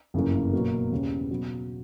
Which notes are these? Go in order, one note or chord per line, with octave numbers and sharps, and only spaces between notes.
G1 F#2 C#3 E3 A#3
B2 F#3 A#3
E2 C#3 G3 C#4
B2 F#3 B3